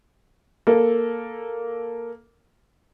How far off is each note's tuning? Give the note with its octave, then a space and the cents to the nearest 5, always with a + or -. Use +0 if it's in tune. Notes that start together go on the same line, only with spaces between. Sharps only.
A#3 +0 A4 +0